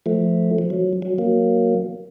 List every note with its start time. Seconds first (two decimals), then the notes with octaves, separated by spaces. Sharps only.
0.06 F3 A3
0.58 F3
0.70 F#3
1.02 F#3
1.18 F#3 A#3